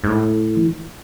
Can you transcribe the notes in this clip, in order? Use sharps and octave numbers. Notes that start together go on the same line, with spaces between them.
G#2
A2
E3